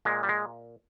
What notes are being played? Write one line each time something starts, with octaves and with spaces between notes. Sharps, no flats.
A#2 G#3
G3
G#3